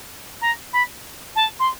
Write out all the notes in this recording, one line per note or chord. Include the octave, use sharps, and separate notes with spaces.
A#5
B5
A5
C6